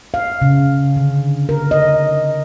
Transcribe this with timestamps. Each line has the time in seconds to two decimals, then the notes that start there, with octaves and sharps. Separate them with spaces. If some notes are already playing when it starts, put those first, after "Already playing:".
0.14 F5
0.42 C#3
0.96 D3
1.49 A#4
1.71 D#5